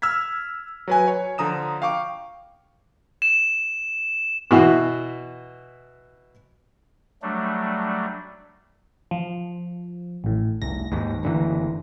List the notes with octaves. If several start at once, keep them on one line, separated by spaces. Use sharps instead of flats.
E6 F6 G#6 B6
F#3 B4 G#5
C#5
D3 F3 A#5 D#6 E7
F5 G5 C#6 D6
E7
B2 E3 F#4
F#3 G3 A3 D4
F3
A1 A2
F1 C2 A#6
D#2 G#2
F#1 D3 E3